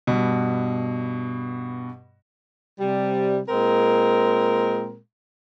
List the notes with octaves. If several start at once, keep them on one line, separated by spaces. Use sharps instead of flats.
G2 B2
C3 G3
A#2 G#3 C4 A#4